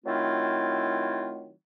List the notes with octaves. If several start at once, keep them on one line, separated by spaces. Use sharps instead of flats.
D#3 F#3 A3 C4 E4 F4